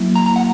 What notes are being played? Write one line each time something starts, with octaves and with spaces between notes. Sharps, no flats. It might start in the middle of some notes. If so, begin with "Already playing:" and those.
Already playing: F#3 A#3 E4
A#5
A#5
F#5